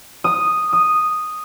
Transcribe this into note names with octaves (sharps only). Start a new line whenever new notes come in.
D#6
D#6